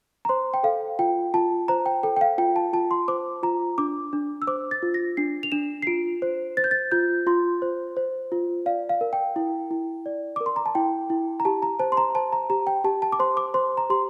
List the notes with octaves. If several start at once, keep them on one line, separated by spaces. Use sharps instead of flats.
A#5
C5 C6
G5
A4 F5
F4 G5
F4 A5
C5 A#5
G5
A4 G5
G5
F5
F4 G5
A5
F4 A5
C6
C5 D6
F4 A#5
D4 D6
D4
E6
C5 D6
A6
F4
A#6
D4 C7
F7
D4 E7
C7
F4 D7
C5
C5 A6
G6
A6
F4 G6
F4 C6
C5
C5
F4
D5 F5
F5
A#4
G5
E4
E4
D5
A#4 D6
C6
A#5
A5
E4 G5
E4
A#5
G4 A5
A#5
C5 A5
C6
A#5
C5 A5
A#5
G4 A#5
G5
G4 A5
A5
D6
C5 C6
D6
C5 C6
A#5
G4 C6